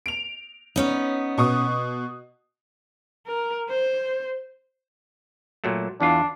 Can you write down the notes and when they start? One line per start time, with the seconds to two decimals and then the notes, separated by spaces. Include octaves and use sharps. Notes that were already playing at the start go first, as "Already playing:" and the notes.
0.06 D7 F7
0.76 B3 C#4 D#4
1.38 B2 C#6 D#6
3.27 A#4
3.69 C5
5.64 A#2 F#3 A3
6.01 E2 E3 D4 F4